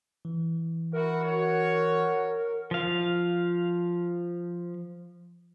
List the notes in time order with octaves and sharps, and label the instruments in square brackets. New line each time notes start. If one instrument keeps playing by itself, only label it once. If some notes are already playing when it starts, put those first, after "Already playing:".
[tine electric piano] E3
[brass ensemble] E4 F#4 [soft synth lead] A#4
[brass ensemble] F#4 C#5
[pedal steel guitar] F3 F5